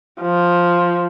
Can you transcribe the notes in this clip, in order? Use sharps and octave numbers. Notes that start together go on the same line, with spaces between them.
F3